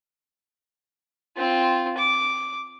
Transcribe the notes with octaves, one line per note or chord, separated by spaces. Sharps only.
C4 F4
D6